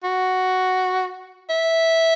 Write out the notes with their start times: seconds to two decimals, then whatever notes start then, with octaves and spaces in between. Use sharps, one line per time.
0.04 F#4
1.50 E5